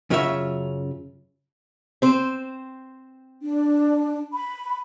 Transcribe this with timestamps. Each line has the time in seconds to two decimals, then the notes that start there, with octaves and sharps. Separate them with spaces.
0.10 F#2 C#3 F#3 C#4 F4 E5
2.02 C4 C5
3.42 D4
4.32 B5